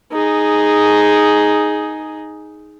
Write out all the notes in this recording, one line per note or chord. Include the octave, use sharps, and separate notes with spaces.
D#4 G#4